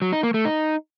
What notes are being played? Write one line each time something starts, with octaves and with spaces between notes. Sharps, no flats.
F#3
D#4
A#3
A3
D#4